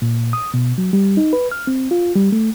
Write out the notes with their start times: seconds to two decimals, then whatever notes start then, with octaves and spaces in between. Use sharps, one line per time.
0.02 A#2
0.33 D#6
0.54 B2
0.78 F#3
0.93 G3
1.17 D#4
1.33 B4
1.51 F6
1.67 C4
1.91 F4
2.15 G3
2.32 A3